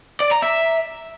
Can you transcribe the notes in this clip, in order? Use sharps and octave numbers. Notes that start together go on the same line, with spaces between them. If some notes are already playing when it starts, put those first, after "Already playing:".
D5
A#5
E5